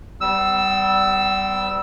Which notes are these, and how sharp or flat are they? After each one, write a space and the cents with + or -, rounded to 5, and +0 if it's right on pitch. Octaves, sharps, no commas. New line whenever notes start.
G3 -15 B3 +45 E6 +0